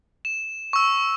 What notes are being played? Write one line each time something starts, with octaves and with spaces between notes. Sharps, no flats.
E7
C#6 E6